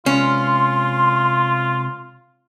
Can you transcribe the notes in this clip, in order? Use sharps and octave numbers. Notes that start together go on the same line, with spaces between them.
C3 G#3 C#4 F4 B4 C6